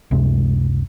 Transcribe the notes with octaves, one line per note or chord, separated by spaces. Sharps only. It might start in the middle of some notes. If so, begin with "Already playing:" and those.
F#1 C#2 C3 G#3